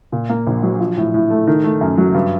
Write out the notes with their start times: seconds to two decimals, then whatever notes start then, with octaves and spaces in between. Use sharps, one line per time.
0.12 A#2
0.30 A#3
0.47 A#1
0.63 F#3
0.80 F3
0.97 A2
1.14 A2
1.30 A3
1.47 D#3
1.64 A3
1.81 F#2
1.98 F#3
2.14 G2